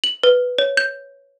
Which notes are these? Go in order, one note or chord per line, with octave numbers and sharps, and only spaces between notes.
F#7
B4
C#5
G6